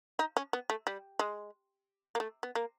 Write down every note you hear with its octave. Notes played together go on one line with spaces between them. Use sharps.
D#4
C#4
B3
A3
G3
G#3
A#3
A3
B3
A#3